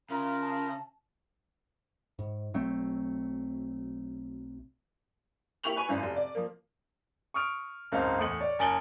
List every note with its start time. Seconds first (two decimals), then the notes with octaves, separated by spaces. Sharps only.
0.10 C#3 F4 A#4 E5 A#5
0.42 A5
2.19 G#2
2.54 B1 F#3 A3 C4
5.64 A#3 E4 G4 C#6 F7 F#7
5.76 B4 G#5 C#6 D#7
5.89 G#1 F#2 E4
6.02 F1
6.16 D5
6.35 F3 A#3
7.34 C#6 D#6 F6 D7
7.92 F#1 C#2 G#2 C4 C5 F5
8.19 E2 A2 C#7 F#7
8.41 C#5 D5
8.59 F#1 G#5 A6 D7 F#7 G7